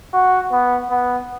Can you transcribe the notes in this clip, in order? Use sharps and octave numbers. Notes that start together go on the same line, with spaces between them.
F#4
B3
B3